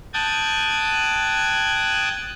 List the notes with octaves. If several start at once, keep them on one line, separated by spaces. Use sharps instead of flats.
G5 A5 D#6 F#6 G#6